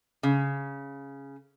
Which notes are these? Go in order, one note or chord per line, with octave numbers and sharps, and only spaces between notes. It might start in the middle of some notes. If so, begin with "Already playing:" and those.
C#3